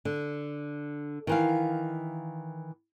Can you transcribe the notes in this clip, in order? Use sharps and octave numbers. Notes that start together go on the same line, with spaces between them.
D3
D#3 E3 F5